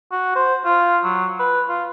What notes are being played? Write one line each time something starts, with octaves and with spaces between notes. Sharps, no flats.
F#4
C5
F4
F#3
B4
F4